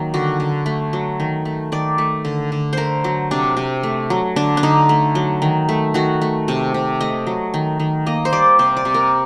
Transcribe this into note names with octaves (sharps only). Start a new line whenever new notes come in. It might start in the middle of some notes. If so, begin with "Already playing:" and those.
Already playing: D#3 F#3 A#3
D3 F#4
D3
A3
F#3
D#3
A3
D#3 D5
A3
D3
D3
A3 A#4 C5
F#3
C3 D4
C3
A3
F#3
D3 D4
D4
D3 D#4
A3
F#3
D#3
A3
D#3 F#4
A3
C3
C3
A3 D#5
F#3
D#3
D#3
A#3 D#5
C5
G3 D5
C3 C5
D5
C3
A#4